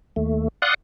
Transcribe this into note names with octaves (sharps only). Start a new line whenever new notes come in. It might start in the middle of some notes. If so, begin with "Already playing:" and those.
D#2 A3
D5 F5 F#5 C6 D#6 F#6